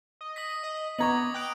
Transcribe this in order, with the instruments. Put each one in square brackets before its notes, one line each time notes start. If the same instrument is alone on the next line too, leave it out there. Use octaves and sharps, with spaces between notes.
[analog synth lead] D#5
[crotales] D#6 A#6 B6
[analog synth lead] D#5
[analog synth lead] B3 [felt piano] D#5 A#5 C#6 [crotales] D6 G#6 F#7
[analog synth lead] G5 [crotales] D#6 F#6 D7